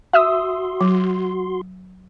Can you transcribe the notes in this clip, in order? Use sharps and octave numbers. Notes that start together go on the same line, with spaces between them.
F#4 E5 C6 D#6 E6
F#3